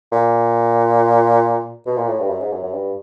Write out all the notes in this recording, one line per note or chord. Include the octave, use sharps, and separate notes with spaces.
A#2
B2
A#2
A2
G2
F#2
G#2
F#2
F#2
G2